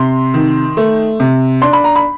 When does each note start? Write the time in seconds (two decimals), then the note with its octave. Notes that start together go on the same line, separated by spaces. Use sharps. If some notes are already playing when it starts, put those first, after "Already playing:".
Already playing: C3 C6
0.34 D#3
0.77 A3
1.20 C3
1.62 D4 C6
1.73 B5
1.84 A#5
1.96 B5